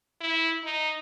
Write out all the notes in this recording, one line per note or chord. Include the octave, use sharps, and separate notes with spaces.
E4
D#4